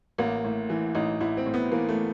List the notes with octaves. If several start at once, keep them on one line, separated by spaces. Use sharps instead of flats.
A1 A#3
A2
E3
A1 D#4
A1 E4
C4
A2
B3
E3 A#3
A3